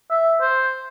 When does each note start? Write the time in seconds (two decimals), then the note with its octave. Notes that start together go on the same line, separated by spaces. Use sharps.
0.11 E5
0.41 C5